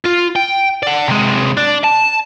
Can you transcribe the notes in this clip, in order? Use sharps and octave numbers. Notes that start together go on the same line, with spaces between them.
F4
G5
D5 F#5
C3 G#3
D4
A5